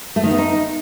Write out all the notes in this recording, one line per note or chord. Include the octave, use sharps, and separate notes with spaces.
A3
D#3
B3
D#4